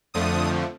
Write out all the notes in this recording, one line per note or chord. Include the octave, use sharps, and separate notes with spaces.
F2 D3 F3 A3 D#6